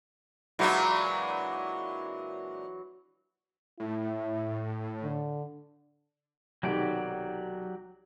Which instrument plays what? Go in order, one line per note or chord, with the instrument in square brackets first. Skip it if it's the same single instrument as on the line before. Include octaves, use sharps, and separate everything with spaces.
[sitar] A#2 G#3 D4 [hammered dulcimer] E3 F#3
[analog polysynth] A2 [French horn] E4
[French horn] D3
[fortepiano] B1 C3 D#3 [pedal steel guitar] F#3 G4 D5